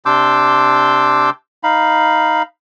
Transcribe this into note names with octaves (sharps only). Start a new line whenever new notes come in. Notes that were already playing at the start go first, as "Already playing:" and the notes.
C3 D4 C6 D6 E6 G6
D#4 F5 B5